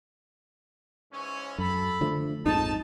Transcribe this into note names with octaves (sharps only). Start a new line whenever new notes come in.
G#2 E3 C#4
F#2 A4 B5
D3 F3 A3
A#1 F2 G#2 D#4 A5